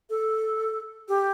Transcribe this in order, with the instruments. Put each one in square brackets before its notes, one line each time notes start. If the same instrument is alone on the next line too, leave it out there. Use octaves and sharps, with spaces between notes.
[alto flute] A4
G4